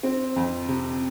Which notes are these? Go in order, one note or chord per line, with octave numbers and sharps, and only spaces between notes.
C4
F2
C3